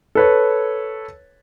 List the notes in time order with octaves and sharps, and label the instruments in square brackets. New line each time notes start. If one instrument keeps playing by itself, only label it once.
[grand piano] A4 B4 C#5